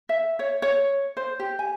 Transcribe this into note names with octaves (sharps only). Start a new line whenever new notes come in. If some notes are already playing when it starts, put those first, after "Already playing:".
E5
C#5
C#5
C5
G4
G#5